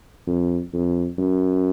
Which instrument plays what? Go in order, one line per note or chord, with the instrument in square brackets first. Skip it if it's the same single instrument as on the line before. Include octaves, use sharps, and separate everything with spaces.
[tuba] F2
F2
F#2